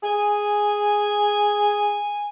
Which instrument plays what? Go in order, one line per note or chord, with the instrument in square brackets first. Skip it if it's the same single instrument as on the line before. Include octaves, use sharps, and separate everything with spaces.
[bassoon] G#4 [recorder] G#5